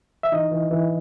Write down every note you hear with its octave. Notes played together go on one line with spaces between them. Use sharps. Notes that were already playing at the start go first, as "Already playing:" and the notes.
E5
E3 D#4 D#5
E3
E3